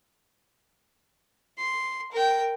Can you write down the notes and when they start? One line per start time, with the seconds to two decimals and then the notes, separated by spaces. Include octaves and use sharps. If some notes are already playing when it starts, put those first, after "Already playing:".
1.58 C6
2.12 A#4 G5